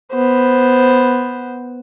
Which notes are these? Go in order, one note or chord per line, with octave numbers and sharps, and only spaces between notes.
B3 C5